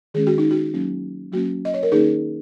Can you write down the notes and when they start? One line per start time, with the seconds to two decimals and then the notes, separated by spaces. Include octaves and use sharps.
0.14 D#3 G#3 C#4 G#4
0.27 F#4
0.38 D#4
0.51 F#4
0.74 F#3 A#3 C#4
1.32 F#3 A#3 C#4 F#4
1.65 D#5
1.74 C#5
1.83 A#4
1.92 D#3 A#3 C#4 D#4 G#4